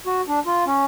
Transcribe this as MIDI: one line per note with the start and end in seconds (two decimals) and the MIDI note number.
0.06 0.21 66
0.28 0.39 62
0.46 0.64 65
0.67 0.85 61